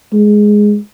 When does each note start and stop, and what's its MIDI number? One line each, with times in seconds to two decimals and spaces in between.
0.13 0.78 56